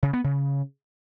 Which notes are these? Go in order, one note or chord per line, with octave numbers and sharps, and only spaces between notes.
C#3
B3
C#3